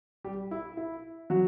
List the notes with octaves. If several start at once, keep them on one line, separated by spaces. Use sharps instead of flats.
G3 G4
E4
E4
F#3 F#4